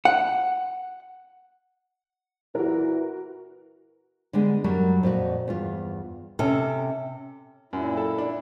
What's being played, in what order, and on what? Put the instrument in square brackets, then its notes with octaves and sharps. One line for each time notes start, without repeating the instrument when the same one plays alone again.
[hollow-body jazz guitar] F#5
[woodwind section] E2 A#2 E3 [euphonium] E4 [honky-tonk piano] F#4 A#4
[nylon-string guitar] D3 G3 G#3 B3
F#2 F#3 G3 A#4
F2 A#2 F#4
E2 G2 F4
C3 C#4 A4
[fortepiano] F#2 [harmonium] A#2 E4
[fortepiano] A4
D4